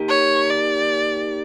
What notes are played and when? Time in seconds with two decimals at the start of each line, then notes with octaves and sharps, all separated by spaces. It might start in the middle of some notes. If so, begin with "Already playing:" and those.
Already playing: A#3 D#4 G4
0.09 C#5
0.50 D5